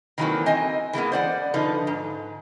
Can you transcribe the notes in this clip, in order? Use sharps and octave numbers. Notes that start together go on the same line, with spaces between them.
D#3 E3 F#3 A3 A#3 C4
C4 D#5 G#5
E3 G#3 A#3 B3
C5 D5 F#5
D3 F3 D#4 B4
G#2